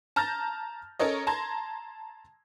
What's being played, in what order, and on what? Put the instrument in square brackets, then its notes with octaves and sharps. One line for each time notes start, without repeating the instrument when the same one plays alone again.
[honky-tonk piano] A5 A#5 F6 G6 A6 A#6
C#4 A4 A#4 C#5 D#5
A5 A#5 C6 G#6 A#6